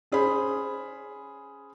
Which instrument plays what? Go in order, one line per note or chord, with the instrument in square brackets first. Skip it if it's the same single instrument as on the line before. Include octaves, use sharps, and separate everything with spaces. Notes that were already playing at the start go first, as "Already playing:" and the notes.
[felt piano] C#4 G#4 C5 B5